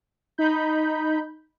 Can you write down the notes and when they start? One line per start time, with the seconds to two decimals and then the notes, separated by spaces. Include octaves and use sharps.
0.38 D#4 B5 G6